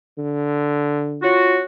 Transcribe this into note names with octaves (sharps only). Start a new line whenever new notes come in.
D3
C#4 F4 F#4